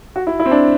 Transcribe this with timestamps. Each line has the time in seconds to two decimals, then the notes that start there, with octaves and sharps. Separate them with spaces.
0.16 F#4
0.27 E4
0.40 E4
0.46 C4
0.52 D4